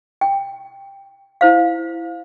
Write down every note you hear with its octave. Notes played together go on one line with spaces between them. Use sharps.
G5
E4 C5 F5